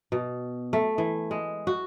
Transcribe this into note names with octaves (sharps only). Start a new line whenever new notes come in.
B2
A3
E3
G#3
F#4